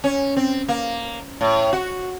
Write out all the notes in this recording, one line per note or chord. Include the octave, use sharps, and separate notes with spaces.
C#4
C4
A#3
A2
F#4